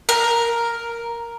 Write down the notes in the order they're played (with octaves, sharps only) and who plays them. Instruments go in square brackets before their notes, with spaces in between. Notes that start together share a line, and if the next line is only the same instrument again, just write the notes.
[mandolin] A#4